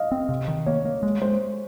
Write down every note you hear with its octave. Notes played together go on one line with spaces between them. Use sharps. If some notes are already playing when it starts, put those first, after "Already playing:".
Already playing: D#5 F5
C4
C3
D#3
A#3 C#5
A#3
G#3
G#3 C5